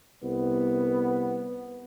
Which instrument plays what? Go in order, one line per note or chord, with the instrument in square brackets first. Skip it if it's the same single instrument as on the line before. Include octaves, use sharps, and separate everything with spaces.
[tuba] C2 [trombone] B3